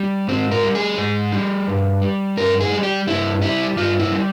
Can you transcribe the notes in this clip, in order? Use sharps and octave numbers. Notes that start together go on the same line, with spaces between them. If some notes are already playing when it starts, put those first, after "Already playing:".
Already playing: G3
G#2 C4
A#4
G3
G#4
G#2
G3
G2
G3
G2 A#4
G#4
G3
G4
G2 E4
G3 E4
G2 F4
E4
G3